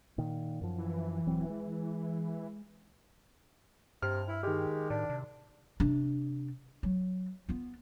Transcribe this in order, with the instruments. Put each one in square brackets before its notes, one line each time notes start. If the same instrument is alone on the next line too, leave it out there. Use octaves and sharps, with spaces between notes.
[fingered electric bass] A#2 D#3
F#2 F3
[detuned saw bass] E3
[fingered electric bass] D#1 F#3 C4
G#3
[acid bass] G2 [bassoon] C3 [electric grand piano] F6
[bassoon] E4
[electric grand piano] D#3 G4 [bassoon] G#3
[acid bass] A2 [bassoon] D4
[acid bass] C3
[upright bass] C3 D4
F#3
B3 F4